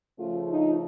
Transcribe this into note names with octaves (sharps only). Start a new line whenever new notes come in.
C#3 F3 A3 F4
D#4